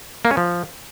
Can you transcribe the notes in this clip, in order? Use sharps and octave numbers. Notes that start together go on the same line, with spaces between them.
A#3
C#4
F3